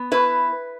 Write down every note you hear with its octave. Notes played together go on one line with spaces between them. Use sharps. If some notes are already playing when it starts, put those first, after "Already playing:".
Already playing: B3
E4 B4